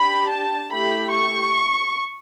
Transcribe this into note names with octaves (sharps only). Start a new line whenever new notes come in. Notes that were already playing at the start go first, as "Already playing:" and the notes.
Already playing: D4 G4 B5
A5
A3 E4 G4 B5
C#6